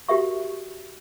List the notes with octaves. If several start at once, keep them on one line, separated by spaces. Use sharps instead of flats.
F#4 G4 A#4 E5 C#6